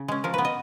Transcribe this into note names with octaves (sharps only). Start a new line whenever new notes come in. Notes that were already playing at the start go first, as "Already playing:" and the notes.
Already playing: C#3
G#3 C#4
F3 A#4
B3 B4
D#5